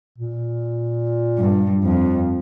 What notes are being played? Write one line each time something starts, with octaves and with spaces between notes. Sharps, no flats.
A#2
G2
F2